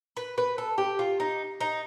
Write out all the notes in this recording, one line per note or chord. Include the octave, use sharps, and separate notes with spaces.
B4
B4
A4
G4
F4
D#4
D#4